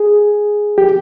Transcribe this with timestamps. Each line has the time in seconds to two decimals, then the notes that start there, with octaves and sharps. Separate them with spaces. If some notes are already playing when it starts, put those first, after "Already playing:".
Already playing: G#4
0.78 G4